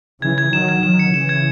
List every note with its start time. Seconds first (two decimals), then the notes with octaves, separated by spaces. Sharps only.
0.22 C#3 E3 G#6
0.38 G#6
0.53 D#3 F#3 E7
0.69 G#6
0.83 D#3 F#3 E7
0.99 C#7
1.14 C#3 E3 E7
1.29 G#6